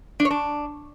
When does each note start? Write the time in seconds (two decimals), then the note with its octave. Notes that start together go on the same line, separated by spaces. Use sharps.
0.20 D4
0.25 C#5
0.30 D4